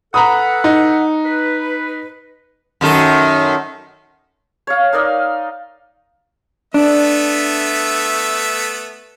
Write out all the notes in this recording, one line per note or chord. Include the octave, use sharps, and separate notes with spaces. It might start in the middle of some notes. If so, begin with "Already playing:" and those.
A4 B4 F#5 A#5 B5 D#6
D#4
B4
F#2 D#3 A4
C#5 F5
D#4 A#4 D5 D#5
A3 B3 D4 E5